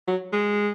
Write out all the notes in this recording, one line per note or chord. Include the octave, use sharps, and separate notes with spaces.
F#3
G#3